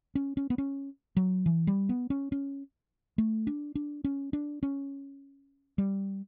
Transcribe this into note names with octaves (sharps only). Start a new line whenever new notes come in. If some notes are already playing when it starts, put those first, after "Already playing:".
C#4
C#4
B3
C#4
F#3
E3
G3
B3
C#4
C#4
A3
D4
D4
C#4
D4
C#4
G3